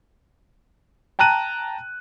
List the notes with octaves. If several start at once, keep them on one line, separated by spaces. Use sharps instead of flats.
G5 A5 A#5 F#6 D#7